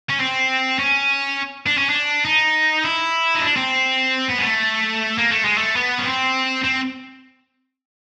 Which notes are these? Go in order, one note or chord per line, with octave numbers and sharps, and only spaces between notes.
C#4
C4
C#4
D4
C#4
D4
D#4
E4
D#4
D4
C4
B3
G#3
A3
A#3
A3
G#3
A3
B3
C#4
C4
C4